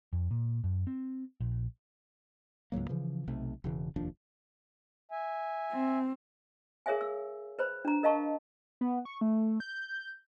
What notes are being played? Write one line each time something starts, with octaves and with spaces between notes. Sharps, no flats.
F2
A#2
F#2
C4
A#1
C#2 G#2 F#3 A#3
C#3 E3 F3
B1 C3 A3
E1 C#3 E3
F1 D#2 F3 D4
E5 G#5
C4
G#4 A#4 C#5 E5 F5 G#5
E6
B4 C5 B5
D4 A#5
A#4 D#5 F5 A5 C#6
B3
C#6
A3
G6